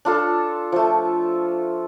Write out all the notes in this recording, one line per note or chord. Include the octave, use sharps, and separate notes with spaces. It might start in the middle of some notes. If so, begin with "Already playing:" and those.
D4 F4 A4
F3 A3